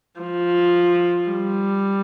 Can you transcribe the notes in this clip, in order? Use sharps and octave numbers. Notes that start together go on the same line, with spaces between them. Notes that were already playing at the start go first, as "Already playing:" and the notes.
F3
G3